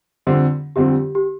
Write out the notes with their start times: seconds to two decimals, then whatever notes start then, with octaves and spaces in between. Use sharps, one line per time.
0.27 F2 D3 G3 C4
0.76 F2 D3 G3 C4 G4
1.15 G4